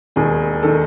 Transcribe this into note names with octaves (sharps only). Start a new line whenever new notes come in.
E1 D#2 D#3 G#4
D#3 A4